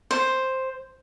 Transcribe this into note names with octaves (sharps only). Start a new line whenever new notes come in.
C5